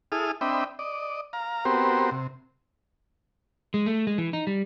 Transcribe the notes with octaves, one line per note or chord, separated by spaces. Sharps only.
E4 G#4 A4 D#6 F6
C4 D4 D#5 E5 G5 B5
D5 D#5
F5 A#5
B3 C4 F#4 G4 A#4 C5
C3
G#3
A3
G#3
E3
D#4
G3